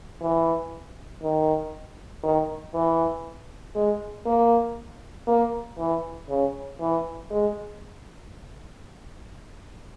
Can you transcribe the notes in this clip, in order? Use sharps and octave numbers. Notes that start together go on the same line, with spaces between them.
E3
D#3
D#3
E3
G#3
A#3
A#3
E3
C#3
E3
G#3